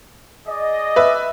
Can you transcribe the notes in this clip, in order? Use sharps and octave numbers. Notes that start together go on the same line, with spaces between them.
G#4 D5 D#5
B4 E5